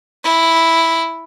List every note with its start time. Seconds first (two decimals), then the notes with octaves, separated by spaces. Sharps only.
0.24 E4